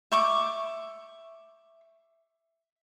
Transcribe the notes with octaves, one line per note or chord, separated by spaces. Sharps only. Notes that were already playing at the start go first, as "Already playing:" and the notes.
E5 C#6 D6